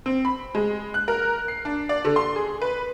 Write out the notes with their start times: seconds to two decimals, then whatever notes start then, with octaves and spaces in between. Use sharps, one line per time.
0.06 C4
0.25 B5
0.55 G#3
0.94 F#6
1.08 A#4
1.48 C7
1.65 D4
1.89 D5
2.05 D3
2.16 C6
2.36 G#4
2.62 B4